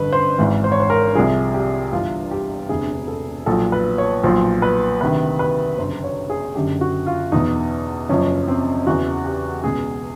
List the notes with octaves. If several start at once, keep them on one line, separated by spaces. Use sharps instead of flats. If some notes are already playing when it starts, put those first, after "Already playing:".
Already playing: A1 G2 D3 B4
C5
G#1 G#2 E3
C5
C#5
C5
A#4
C2 C3 F3 G#4
G4
G1 G2 E3 F4
G4
E1 D2 C3 G#4
A4
B1 A#2 F3 A4
B4
C#5
B1 A#2 F3 C5
B4
D2 C3 D#3 B4
B4
G1 F#2 C#3 C5
C#5
G#4
F#1 F#2 D3 G4
F#4
F4
E2 B2 D#4
F#1 F#2 C#3 F3 C#4
C4
E2 C#3 E3 F#4
G4
C#2 B2 G#4